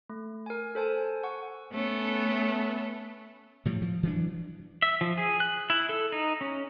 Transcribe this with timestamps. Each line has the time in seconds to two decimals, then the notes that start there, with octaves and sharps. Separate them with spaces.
0.10 A3
0.46 A#4 G#5
0.75 A4 C5 G#5 A5
1.23 F#5 G#5 C#6
1.72 A3 B3 C#4 A4
3.65 A2 F3 G3
3.82 F3
4.03 E3 F#3 D4
4.82 E5
5.01 F3
5.18 G#4
5.40 F#6
5.70 E4
5.89 A4
6.12 D#4
6.41 C#4